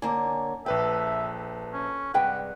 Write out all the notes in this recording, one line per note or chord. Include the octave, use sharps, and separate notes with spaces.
D3 A#3 C#5 G#5
A#1 A4 B4 E5 G5
C#4
G2 C3 G#3 B4 F#5 G5